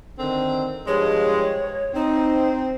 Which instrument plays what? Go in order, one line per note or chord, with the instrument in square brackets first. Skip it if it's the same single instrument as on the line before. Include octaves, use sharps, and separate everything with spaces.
[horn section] D3 D#3 C4
[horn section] G2 F3 G#3 [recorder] C#5
[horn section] C4 [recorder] D#4